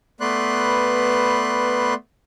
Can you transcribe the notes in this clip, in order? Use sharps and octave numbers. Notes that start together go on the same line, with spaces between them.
A3 B3 B4 D5 C6 F#6